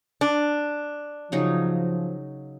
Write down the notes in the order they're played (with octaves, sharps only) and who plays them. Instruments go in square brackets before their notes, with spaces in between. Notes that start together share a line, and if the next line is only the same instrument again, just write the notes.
[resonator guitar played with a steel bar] D4
[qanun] C#3 F#3 D#4 [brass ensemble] F3